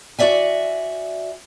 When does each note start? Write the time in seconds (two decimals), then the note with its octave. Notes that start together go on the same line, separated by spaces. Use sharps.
0.19 F#4 G#4 D5 E5 G#5